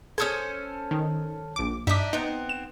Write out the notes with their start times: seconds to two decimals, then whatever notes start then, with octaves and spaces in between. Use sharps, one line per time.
0.18 C#4 G#4 A4 C5 D#6 G#6
0.91 D#3
1.56 A#1 D6
1.87 G2 D4 D#4 E5 D6 B6
2.13 B3 C4 D#4
2.49 E7